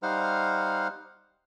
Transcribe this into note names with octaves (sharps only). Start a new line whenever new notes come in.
G3 D#4 C5 F5 F#5 F6